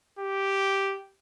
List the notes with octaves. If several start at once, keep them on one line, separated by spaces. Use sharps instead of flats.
G4